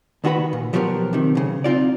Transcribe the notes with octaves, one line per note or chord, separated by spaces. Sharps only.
D#2 D#3 F#4 G#4 B4 B5
A#2
B2 F3 F#3 B3 G4 A#4
C3 D#3
B1 C#3
C4 D#4 F4 D5